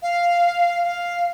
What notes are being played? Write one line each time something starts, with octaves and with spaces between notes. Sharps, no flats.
F5
F5